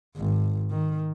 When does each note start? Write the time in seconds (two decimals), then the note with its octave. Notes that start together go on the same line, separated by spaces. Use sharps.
0.17 G#1
0.71 D#3